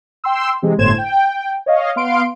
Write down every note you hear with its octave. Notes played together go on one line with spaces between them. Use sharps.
G5 C6 E6
C3 E3 G#3
G1 A2 C5 G#6 E7
G5
C#5 D#5 F5
B3 F5 C6 D7